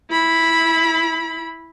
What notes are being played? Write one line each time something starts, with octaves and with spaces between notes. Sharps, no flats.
E4 B5